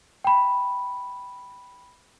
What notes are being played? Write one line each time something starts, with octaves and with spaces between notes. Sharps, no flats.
G5 B5